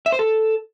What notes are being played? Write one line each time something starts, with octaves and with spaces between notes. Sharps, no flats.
E5
C5
A4